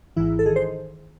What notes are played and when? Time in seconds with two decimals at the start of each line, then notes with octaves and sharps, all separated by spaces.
0.16 G#1 G#2 E3 E4
0.39 A4
0.46 D#3 G#4
0.56 C5